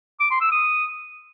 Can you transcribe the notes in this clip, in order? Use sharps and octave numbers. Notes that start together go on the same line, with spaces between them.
D6
C6
E6
D#6